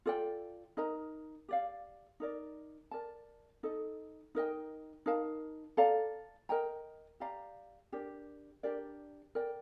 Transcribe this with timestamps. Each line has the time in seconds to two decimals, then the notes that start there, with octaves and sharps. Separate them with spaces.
0.06 F4 A4 D5 G5
0.77 D#4 A#4 D#5 A#5
1.49 G4 D5 F5
2.20 D#4 A#4 D5
2.91 A#4 D5 A5
3.63 D#4 A4 D#5
4.35 D#4 A#4 D#5 G5
5.06 D#4 A#4 F5 A5
5.77 A4 D5 F5 A#5
6.49 A#4 D#5 G5 A#5
7.20 G4 D5 F5 A#5
7.92 D4 G4 A#4 D5
8.63 D4 G4 A#4 D5
9.35 A#4 D5 G5